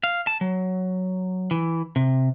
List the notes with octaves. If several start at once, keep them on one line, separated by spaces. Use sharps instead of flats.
F5
A5
F#3
E3
C3